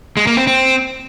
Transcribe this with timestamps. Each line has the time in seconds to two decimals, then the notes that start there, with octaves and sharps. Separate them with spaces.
0.17 G#3
0.27 A#3
0.37 C4
0.47 C4